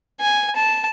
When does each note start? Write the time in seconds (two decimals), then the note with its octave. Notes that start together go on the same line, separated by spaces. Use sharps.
0.20 G#5
0.55 A5